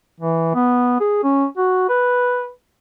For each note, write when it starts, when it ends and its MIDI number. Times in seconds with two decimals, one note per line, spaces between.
0.20 0.54 52
0.54 0.99 59
1.00 1.20 68
1.23 1.45 61
1.57 1.87 66
1.89 2.50 71